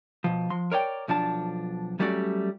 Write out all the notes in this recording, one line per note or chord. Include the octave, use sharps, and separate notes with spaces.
B2 F3
F3 C6
A#4 C#5 D5 G5
B1 F3 D4 A5
F#3 G3 A3 C#4 F#4 D5